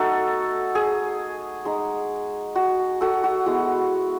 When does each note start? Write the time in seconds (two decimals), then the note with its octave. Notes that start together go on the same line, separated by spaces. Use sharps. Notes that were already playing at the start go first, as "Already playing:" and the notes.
Already playing: A3 D#4 F#4 A4
0.75 G#4
1.65 G#3 D#4
2.55 F#4
3.01 F#4 A4
3.24 F#4
3.46 G#3 B3 E4 F#4